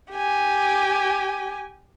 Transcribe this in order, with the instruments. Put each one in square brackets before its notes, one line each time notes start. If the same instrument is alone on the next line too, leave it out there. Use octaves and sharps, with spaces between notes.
[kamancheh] G4 G#5